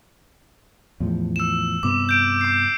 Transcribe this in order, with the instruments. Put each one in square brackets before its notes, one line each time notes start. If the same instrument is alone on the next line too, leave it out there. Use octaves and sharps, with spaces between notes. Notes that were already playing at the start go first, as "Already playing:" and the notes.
[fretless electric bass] E2 A2 F3
[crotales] E6 E7
[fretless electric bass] G2 C3 B3 [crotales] D6
[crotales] G6 D7
D6 C7